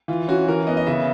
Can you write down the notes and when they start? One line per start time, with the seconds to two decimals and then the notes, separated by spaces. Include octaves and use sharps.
0.08 E3 F4
0.28 C#4 F#4
0.48 E3 A#4
0.67 B3 D#5
0.77 D#5
0.87 C#3 E5